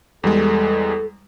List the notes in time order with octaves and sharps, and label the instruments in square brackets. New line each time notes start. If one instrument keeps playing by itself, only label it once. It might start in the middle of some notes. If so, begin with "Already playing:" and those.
[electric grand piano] E2 G3 G#3 [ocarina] A4